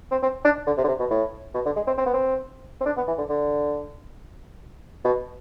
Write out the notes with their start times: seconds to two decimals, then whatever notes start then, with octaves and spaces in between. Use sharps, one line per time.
0.12 C4
0.23 C4
0.45 D4
0.67 D3
0.78 C3
0.84 D3
0.88 C3
0.99 B2
1.10 A2
1.54 B2
1.66 D3
1.76 G#3
1.87 C4
1.98 C4
2.06 B3
2.14 C4
2.81 C4
2.86 D4
2.97 B3
3.08 E3
3.18 D3
3.29 D3
5.05 B2